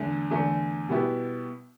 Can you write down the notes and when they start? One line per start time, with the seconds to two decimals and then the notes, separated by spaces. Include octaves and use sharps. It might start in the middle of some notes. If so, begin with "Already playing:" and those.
Already playing: E2 D3 A3
0.30 E2 D3 A3
0.89 B2 G3 B3 E4 G4